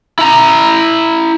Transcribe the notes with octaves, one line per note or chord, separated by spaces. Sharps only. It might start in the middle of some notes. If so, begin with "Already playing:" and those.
E4 A#5